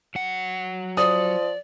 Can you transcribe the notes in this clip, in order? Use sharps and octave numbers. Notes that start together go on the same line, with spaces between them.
F#3 F#5
F3 D5 D#6